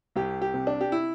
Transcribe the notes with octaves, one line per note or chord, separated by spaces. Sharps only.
C2 G4
G4
C3
D4
G4
E4